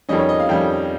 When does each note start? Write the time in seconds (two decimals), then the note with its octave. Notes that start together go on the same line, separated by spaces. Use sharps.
0.09 F2 D#3 G3 C#4 D#5
0.19 C#5
0.29 D#5
0.40 F5
0.49 F2 D#3 G3 C#4 G5